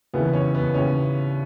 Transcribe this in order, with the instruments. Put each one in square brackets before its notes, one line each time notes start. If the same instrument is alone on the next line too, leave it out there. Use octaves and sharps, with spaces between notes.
[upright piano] D#2 C#3 E3 B3
C#4
B3
D#2 C#3 E3 C#4